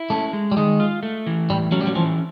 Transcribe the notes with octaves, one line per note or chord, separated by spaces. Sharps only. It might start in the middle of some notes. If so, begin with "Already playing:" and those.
Already playing: E4
A3 C#4
G#3
G3
D#3 G#3
F4
A3
E3
A2 G3
F#3 C#4
G3
F#3
E3 F3